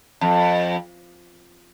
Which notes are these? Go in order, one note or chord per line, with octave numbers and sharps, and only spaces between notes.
F2